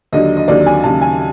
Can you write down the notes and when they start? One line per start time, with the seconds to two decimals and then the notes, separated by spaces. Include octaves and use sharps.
0.13 D#2 D3 F#3 D#5
0.37 D#5
0.48 D#2 D3 F#3 D5
0.66 G#5
0.84 D#2 C#3 F#3 A5
1.01 G#5